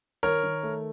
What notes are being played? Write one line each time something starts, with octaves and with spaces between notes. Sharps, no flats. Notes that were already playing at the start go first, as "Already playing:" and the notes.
D#3 A#4 C#5
D#3
A3